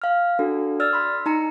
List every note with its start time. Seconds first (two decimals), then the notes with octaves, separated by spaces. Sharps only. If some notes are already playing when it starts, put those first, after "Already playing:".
0.02 F5 F6
0.39 D4 F#4 A4
0.80 D5 E6 F6 A6
0.93 B5 C6
1.26 D#4 A#5 C#7